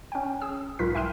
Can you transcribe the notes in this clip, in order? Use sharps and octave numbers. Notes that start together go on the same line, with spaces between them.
C#4 G5
G#4 E6
B1 G#2 F4 A#4 B4 B6
E4 E5 G5 C6 F6 D#7